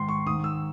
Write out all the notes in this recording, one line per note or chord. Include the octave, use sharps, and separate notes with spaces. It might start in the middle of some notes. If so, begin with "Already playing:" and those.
Already playing: G#2 D#3 C6
C#6
G#2 D#3 D#6
E6